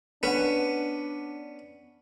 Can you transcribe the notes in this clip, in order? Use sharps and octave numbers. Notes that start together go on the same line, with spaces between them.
B3 C#4 D4 B4 F#5